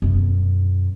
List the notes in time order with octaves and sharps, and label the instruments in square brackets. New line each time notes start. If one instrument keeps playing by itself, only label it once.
[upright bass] F#2 B2